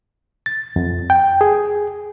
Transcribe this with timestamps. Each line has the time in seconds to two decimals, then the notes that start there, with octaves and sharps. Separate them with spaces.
0.46 A6
0.76 F2
1.10 G5
1.41 G#4